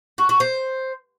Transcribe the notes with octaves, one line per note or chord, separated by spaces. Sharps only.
F#4
F#4
C5